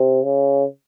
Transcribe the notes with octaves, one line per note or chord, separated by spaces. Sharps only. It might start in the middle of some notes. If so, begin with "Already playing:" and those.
Already playing: C3
C#3